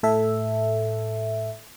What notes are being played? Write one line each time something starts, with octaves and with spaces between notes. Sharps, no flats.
A2 A4 E5